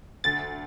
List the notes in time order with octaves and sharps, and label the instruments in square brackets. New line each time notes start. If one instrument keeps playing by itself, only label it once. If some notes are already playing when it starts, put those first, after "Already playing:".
[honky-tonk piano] D2 [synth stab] A6